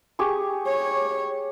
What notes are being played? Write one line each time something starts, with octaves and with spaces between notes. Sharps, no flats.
G4 G#4 C#6
C#5